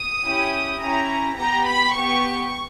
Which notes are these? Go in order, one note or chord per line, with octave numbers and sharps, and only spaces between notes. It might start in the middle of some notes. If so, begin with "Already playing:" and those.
Already playing: D#6
C#4 E4 G4
C#4 E4 G4 A#5
B3 G4 A#5
B5
B3 G4 C#6